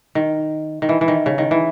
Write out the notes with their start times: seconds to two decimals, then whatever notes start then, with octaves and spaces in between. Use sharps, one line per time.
0.15 D#3
0.82 D#3
0.89 E3
1.01 E3
1.08 D#3
1.26 C#3
1.38 D#3
1.51 E3